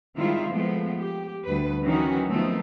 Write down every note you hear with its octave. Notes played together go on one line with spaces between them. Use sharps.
D#3 G3 G#3 C4 E4 F4
F3 G#3 A3 B3
G4
D2 G3 B4
D#3 E3 F#3 C#4 D#4 F#4
D#3 F3 A3 B3 C4